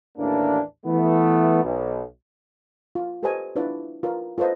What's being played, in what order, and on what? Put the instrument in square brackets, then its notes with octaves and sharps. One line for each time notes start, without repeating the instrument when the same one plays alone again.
[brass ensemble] A1 D#2 E3 A#3 D4
E3 A3 B3
B1
[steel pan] F4
G4 A4 B4 C5 D#5 G#5
D4 E4 F4 B4 D5
F4 A#4 B4 D5
F4 A4 B4 C5 D#5